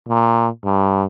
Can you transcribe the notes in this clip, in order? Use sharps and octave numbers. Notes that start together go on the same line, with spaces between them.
A#2
G2